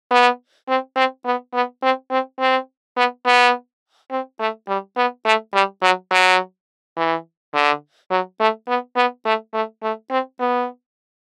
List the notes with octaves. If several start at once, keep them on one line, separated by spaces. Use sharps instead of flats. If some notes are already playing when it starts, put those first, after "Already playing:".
B3
C4
C4
B3
B3
C4
C4
C4
B3
B3
C4
A3
G3
B3
A3
G3
F#3
F#3
E3
D3
F#3
A3
B3
B3
A3
A3
A3
C4
B3